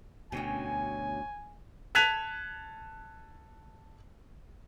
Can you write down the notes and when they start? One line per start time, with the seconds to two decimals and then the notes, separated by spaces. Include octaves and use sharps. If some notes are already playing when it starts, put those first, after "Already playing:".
0.32 D2 B2 C#4 C#5 G5 G#5
1.95 A5 F#6 G#6 B6 D#7 F7